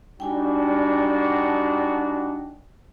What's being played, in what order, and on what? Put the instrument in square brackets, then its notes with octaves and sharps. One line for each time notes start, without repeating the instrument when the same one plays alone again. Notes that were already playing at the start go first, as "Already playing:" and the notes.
[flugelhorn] G3 [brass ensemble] D4 D#4 F#4 [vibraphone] G5 G#5